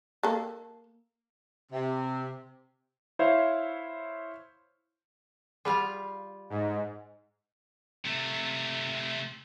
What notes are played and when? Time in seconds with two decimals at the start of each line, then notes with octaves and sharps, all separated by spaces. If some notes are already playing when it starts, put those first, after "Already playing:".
0.23 A#3 A4
1.72 C3
3.19 E4 C5 C#5 E5 F5
5.65 G3 F4 G#4 F5 F#5 B5
6.50 G#2 D#5
8.05 C3 A3